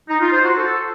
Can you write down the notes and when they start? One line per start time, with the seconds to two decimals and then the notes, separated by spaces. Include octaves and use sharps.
0.09 D#4
0.21 F4
0.33 C5
0.44 F#4
0.56 A4